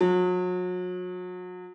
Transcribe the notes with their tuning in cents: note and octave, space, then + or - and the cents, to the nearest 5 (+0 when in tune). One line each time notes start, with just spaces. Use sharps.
F#3 -35